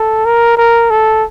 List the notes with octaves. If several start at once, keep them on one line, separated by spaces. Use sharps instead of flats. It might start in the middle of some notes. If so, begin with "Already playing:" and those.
Already playing: A4
A#4
A#4
A4